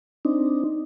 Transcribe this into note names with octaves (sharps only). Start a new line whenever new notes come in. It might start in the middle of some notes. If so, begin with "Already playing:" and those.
C4 D4 D#4